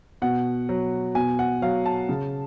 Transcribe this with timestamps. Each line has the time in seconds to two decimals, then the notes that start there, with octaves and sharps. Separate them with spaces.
0.22 B2 F#5
0.69 F#3
1.15 B2 G#5
1.39 F#5
1.62 F#3 F5
1.86 A5
2.09 C#3